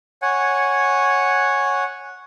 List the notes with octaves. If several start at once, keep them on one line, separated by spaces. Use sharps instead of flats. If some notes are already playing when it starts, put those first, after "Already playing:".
C#5 F#5 G#5